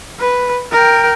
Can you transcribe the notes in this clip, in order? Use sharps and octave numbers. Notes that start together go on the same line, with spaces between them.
B4
A#4 G5